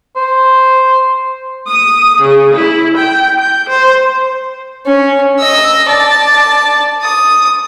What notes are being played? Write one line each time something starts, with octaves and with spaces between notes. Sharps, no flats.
C5
D#6
C#3
E4
G5
G6
C5
C#4
D#5 E6
D5 A5
D#6